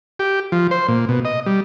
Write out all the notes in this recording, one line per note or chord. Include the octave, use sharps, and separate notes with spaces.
G4
F3
C5
A#2
B2
D#5
G3